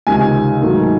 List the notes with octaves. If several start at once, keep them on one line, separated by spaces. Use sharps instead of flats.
C#2 C3 D#3 G#5
G#2 D#3 F#3 A3